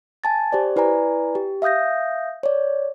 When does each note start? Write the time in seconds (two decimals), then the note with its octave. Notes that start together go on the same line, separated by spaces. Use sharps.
0.24 G#5 A5 A6
0.52 G4 C5 D5
0.76 E4 B4 D5 G#5 A#5
1.35 G4
1.62 E5 F5 D#6 G6 A#6
2.43 C#5 D5